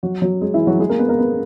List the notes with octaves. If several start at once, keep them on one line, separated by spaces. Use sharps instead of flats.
F#3 F#4
F#3 F#4
G#3 G#4
E3 E4
F#3 F#4
G#3 G#4
A#3 A#4
B3 B4
A#3 A#4
B3 B4